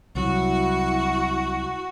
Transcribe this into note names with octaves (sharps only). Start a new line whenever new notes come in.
C2 F#3 E4 F#4